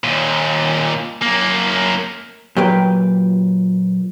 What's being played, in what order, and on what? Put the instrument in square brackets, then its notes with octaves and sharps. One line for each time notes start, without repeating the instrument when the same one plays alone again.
[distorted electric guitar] D#2 A#2
F#2 A#3
[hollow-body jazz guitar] A#2 F#3 G4 B4 G5